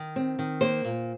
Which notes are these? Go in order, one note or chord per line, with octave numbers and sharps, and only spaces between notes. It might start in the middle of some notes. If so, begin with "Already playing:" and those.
Already playing: D#3
C4
D#3
A#3 C5
A#2